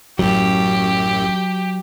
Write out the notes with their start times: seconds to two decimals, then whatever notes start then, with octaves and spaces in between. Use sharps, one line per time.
0.19 A1 F#2 F#3 G4